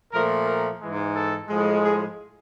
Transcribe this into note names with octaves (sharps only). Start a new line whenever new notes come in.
A#2 F3 A3 A#4
A#4
G#2 E3 G#3
A4
A2 F3 G#3
G#4